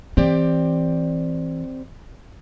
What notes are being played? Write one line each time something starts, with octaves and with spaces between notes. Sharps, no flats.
E3 C4 G4 D5